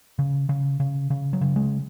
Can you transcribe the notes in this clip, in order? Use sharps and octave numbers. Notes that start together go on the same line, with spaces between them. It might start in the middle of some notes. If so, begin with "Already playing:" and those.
C#3
C#3
C#3
C#3
F#3
C#3
G#3